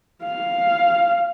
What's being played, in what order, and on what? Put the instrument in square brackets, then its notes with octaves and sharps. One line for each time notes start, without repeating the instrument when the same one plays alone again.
[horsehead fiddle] F5